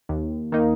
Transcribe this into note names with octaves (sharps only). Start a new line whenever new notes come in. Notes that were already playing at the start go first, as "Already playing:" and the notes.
D#2
D#3 A#3 D#4